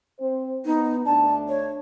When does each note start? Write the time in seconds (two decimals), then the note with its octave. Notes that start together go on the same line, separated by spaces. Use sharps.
0.19 C4 C5
0.66 B3 D#4
1.06 D2 A3 D4 A5
1.49 C#5